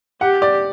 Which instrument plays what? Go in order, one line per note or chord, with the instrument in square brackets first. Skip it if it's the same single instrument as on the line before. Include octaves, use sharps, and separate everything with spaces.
[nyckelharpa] G4 [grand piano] F#5
[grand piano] D5